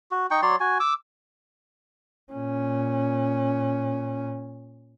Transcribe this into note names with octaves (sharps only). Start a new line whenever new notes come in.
F#4
D#4 G5 C#6
F#3 C#5 D5 C6
F#4 G#5
D6 E6
A#2 C#4